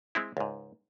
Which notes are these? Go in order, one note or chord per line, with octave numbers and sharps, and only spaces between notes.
G#3 C4 E4
C#2 G#2